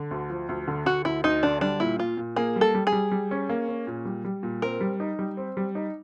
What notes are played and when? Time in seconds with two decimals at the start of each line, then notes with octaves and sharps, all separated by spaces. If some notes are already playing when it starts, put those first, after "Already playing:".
Already playing: D3
0.11 D2
0.30 F3
0.49 D2
0.68 D3
0.86 D3 F#4
1.05 D2 E4
1.24 D2 D#4
1.43 D3 D4
1.61 G3 D4
1.80 A#2 E4
1.99 A#2 F4
2.17 A#2
2.36 A#3 G#4
2.56 G3
2.61 A4
2.75 G3
2.87 G#4
2.92 G3
3.12 G3
3.31 C#4
3.49 A#3
3.69 C#4
3.87 A#2
4.05 G3
4.25 G3
4.43 A#2
4.62 C4 A#4
4.81 G3
5.00 D#4
5.19 G3
5.37 C4
5.57 G3
5.75 D#4